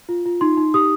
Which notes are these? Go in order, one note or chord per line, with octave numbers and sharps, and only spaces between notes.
F4
F4
D#4 C6
D#4
G4 D#6